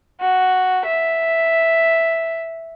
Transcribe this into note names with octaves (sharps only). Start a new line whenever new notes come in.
F#4
E5